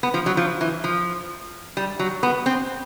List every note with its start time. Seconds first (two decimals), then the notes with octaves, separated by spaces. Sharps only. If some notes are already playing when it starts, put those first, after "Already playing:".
0.03 B3
0.14 F3
0.26 F#3
0.37 F3
0.61 E3
0.84 F3
1.77 G3
1.99 F#3
2.23 B3
2.46 C4